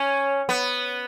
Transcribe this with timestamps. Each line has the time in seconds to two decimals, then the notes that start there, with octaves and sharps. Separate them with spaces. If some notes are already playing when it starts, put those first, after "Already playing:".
Already playing: C#4
0.49 B3